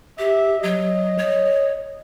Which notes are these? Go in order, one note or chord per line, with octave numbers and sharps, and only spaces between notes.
G4 E5
F#3 D#5
C#5